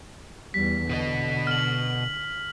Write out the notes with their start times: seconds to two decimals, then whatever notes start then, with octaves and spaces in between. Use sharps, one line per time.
0.54 E2 G3 B6
0.89 B2 D3 B4 D#5
1.47 F6 F#7